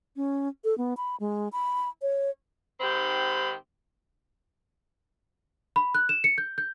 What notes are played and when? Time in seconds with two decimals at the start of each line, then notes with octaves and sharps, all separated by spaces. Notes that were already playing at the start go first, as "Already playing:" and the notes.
0.16 C#4
0.64 A4
0.78 B3
0.97 B5
1.20 G#3
1.52 B5
2.02 C#5
2.80 G#2 D#3 C4 G4 B5
5.76 B5
5.95 F#6
6.09 E7
6.24 C#7
6.38 G6
6.58 G6